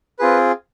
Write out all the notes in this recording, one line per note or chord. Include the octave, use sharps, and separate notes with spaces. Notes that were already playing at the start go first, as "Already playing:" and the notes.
C4 F4 G#4 B4